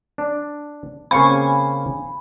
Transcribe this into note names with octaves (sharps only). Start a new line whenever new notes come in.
D4
C#3 A#3 C4 F5 G#5 B5 C#6